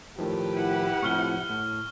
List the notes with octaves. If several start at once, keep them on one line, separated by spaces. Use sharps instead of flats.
A2 D#3 F3 G4 B4
E4 F#5
A2 C3 F3 C#6 F6 G7
A2